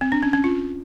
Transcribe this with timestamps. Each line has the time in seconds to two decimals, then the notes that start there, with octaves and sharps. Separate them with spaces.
0.01 C4
0.12 D4
0.23 C#4
0.33 C#4
0.44 F4